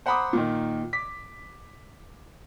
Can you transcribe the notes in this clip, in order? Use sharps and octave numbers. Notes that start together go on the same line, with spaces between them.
C5 F#5 A#5 B5 D6 D#6
A#2 D#3
D6 B6